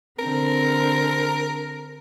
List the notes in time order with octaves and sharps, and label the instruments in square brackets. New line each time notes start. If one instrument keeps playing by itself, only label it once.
[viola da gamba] D3 C4 [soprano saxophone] A#4